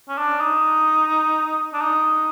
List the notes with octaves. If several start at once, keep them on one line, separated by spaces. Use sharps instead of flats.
C#4
D4
D#4
D4
D#4